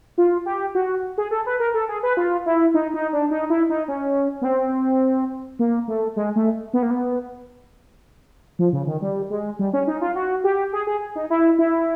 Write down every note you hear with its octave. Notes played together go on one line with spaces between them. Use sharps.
F4
G4
F#4
G#4
A4
B4
A#4
A4
G#4
B4
F4
E4
D#4
D#4
D4
D#4
E4
D#4
C#4
B3
C4
A#3
A3
G#3
A3
B3
A#3
B3
F3
C#3
D#3
G3
G#3
G3
C#4
D#4
F4
F#4
G4
G#4
G#4
D#4
E4
E4